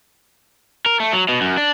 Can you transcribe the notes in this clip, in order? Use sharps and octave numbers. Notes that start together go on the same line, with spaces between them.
A#4
A3
F#3
B2
F#2
D4